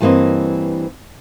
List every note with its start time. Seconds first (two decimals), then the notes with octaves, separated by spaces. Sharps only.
0.01 G2 E3 F#3 A#3 C4 D#5